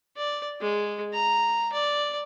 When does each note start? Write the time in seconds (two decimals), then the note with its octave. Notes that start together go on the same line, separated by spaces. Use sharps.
0.17 D5
0.61 G#3
1.13 A#5
1.73 D5